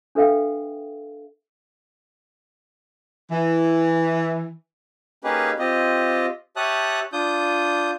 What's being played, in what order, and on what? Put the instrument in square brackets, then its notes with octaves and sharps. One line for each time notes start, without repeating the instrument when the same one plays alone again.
[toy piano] D4 A4 B4 E5 F5 G5
[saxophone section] E3
[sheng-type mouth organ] A#3 C#4 D#4 G4 G#4 B4
C4 F4 G4 D#5
G4 C#5 E5 A5 D#6 F#6
D4 F4 D#6 G6